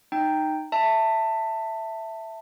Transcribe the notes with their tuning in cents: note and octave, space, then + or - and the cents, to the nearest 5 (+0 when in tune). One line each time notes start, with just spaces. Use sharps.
D#4 -15 G5 +0
E5 +0 A5 +20